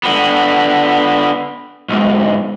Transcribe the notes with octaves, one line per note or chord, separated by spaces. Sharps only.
D3 B3
B1 G#2